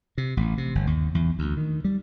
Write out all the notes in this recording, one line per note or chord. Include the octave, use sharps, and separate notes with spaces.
C3
A1
C3
G1
D#2
E2
D2
D#3
G3